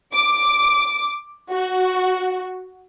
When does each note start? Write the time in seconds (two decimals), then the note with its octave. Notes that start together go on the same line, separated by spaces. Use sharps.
0.14 D6
1.51 F#4